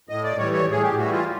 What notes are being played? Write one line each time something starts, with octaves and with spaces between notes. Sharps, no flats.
A2 D#5
D5
E3 G3 C#5
C#5
A2 G#4
G4
E3 G3 F#4
F4